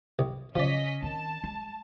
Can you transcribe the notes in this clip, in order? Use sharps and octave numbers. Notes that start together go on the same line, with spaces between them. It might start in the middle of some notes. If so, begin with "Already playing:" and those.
C2
C#3 F3 C#4 D5 D#5 B6
D#3 C4 A5
G#3